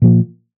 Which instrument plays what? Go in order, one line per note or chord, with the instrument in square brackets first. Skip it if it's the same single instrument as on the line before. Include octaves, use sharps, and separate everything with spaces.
[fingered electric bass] A#2 F3 A#3